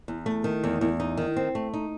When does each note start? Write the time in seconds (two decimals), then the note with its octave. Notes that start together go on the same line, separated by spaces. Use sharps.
0.08 E2
0.26 A3
0.44 D#3
0.64 E2
0.81 E2
1.00 D#4
1.17 D#3
1.36 C4
1.55 A3
1.74 D#4